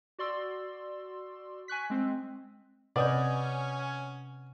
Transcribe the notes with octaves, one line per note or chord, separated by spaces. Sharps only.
F#4 D5 C6 E6
G#5 C#6 F#6 B6
G#3 C4
C3 C#4 B4 D5 D#5 F#5 D#6 G6